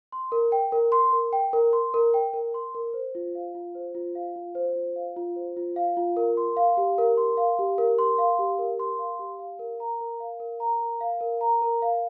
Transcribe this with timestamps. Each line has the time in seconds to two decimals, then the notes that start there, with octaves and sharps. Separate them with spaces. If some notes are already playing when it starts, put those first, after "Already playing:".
0.12 C6
0.32 A#4
0.52 G5
0.72 A#4
0.92 C6
1.13 A#4
1.33 G5
1.53 A#4
1.73 C6
1.94 A#4
2.14 G5
2.34 A#4
2.54 C6
2.75 A#4
2.94 C5
3.15 F4
3.35 F5
3.55 F4
3.75 C5
3.95 F4
4.15 F5
4.36 F4
4.55 C5
4.76 F4
4.96 F5
5.17 F4
5.36 C5
5.57 F4
5.76 F5
5.97 F4
6.17 A#4
6.37 C6
6.57 F5
6.77 G4
6.98 A#4
7.17 C6
7.37 F5
7.59 G4
7.78 A#4
7.99 C6
8.18 F5
8.39 G4
8.59 A#4
8.79 C6
8.99 F5
9.19 G4
9.39 F5
9.59 A#4
9.80 A#5
10.01 A#4
10.20 F5
10.40 A#4
10.60 A#5
10.81 A#4
11.01 F5
11.21 A#4
11.41 A#5
11.62 A#4
11.82 F5